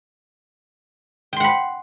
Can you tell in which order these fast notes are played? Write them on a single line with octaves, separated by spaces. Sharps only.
G5 C6 F#5 B5